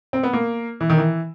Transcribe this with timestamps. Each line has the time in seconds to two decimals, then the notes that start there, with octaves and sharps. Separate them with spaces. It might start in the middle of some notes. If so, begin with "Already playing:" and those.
0.13 C4
0.23 B3
0.33 A#3
0.80 E3
0.90 D#3
0.98 E3